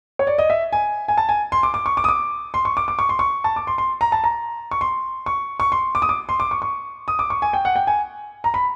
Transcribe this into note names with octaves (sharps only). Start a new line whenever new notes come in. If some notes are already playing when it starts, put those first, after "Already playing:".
C#5
D5
D#5
E5
G#5
G#5
A5
G#5
C6
D6
D6
C#6
D6
D#6
D6
C6
C#6
D6
D6
C#6
C6
C#6
A5
D6
C6
C6
A#5
A5
A#5
C#6
C6
C#6
C#6
C6
D6
D#6
D6
C6
D6
C#6
C#6
D#6
D6
C#6
G#5
G5
F#5
G5
G#5
A#5
B5